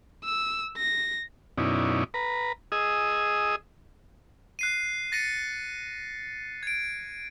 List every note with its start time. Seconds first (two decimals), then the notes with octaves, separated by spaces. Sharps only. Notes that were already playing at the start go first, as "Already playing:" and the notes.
0.24 E6
0.77 A#6
1.58 F#2 B2 C#4 D#4 E4 D5
2.14 B4 A#5
2.72 G#4 D#5 D#6 E6
4.59 F#6 C7 D#7
5.12 A6 A#6 C#7 D#7
6.63 G#6 D7